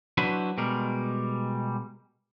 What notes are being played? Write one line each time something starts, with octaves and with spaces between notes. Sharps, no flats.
F#3 D4 E4 F#4 B4 C5
B2 G3 G#3 A#4